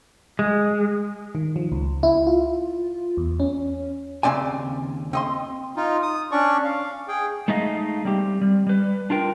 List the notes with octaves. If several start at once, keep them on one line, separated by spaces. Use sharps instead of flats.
G#3
D#3
F3
C#2
E4
F4
E2
C#4
D#2 C#3 C4 D5 G#5
C4 D#5 C6
D#4 F4
D#6
C#4 D4 D5 C#6
F5
G#4 G5
G#3 A3 D#4 G#4 D#5 F5
G3 C4 G4
G3
G3 B4
D4 F4 A#4 G5